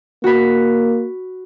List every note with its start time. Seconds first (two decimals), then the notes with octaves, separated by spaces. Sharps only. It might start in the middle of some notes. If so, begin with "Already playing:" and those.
0.24 A#3 F#4 B5